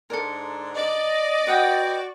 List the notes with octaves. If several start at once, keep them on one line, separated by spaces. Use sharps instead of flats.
G#2 D3 D4 A4 A#4
D5 D#5
F#4 B4 F#5 G5